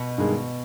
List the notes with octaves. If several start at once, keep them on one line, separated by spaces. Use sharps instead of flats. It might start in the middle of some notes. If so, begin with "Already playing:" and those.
Already playing: B2
G2 D#3 G#3